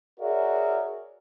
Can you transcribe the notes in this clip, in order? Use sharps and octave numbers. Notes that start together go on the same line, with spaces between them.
F#4 G#4 A#4 C#5 D5 E5